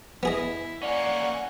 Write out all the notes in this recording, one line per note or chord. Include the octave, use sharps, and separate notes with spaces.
B3 E4 G#4 D#5
A#3 C#4 D5 F#5 G#5